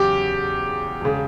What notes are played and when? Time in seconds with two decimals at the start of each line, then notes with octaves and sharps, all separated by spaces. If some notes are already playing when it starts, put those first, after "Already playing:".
Already playing: E2 C#3 F#3 G4
1.01 E1 C#3